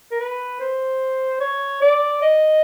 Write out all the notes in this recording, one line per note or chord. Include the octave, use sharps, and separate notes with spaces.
A#4
B4
C5
C#5
D5
D#5